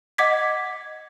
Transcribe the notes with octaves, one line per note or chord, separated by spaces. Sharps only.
D#5 F#5 D6 G#6 B6